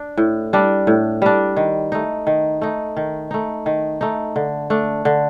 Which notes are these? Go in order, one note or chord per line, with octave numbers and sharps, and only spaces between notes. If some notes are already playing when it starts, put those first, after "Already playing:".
Already playing: D4
A2
G3 D4
A2
G3 D4
D#3
A3 D#4
D#3
A3 D#4
D#3
A3 D#4
D#3
A3 D#4
D3
A3 D4
D3